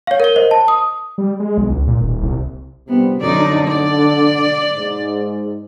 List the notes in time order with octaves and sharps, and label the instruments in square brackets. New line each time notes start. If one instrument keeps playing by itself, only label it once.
[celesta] C#5 F5
A#4 G7
C5 D#5
A5
D#6
[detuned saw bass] G3
G#3
B1
C#2
A#2
D#1
C2
[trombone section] A#1 C3 G3 [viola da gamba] B3
[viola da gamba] F#2 D#4 D5 [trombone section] D3
[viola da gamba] D5
[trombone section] G#2